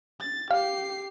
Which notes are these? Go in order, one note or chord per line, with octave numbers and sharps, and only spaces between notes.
A6
G4 F5 C7